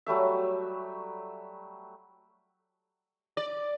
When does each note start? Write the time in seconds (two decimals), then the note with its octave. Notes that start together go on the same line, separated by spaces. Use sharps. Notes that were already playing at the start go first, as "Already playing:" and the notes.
0.06 F#3 G3 A3 E5
3.37 D5